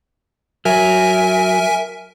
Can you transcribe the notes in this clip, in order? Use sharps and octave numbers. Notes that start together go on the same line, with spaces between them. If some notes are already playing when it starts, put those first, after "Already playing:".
F#3 A#4 E5 G#5